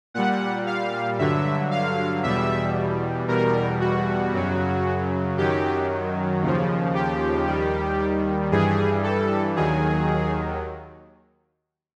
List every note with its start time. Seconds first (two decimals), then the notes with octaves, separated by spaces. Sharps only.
0.14 A#2 G3 F#5
0.66 F5
1.19 G2 D3 F#3 E5
1.71 F5
2.23 E2 B2 G3 E5
3.28 E2 B2 G3 A#4
3.80 F#4
4.33 F#2 C#3 F#3
5.37 F#2 D#3 F#3 G4
6.42 D#2 C#3 F3
6.94 G4
7.46 D#2 D#3 G3
8.51 G2 E3 G3 G#4
9.03 A4
9.56 D#2 D#3 F#3 G#4